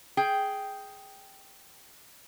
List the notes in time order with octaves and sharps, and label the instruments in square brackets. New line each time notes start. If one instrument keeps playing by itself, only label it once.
[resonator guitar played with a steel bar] G#4 G5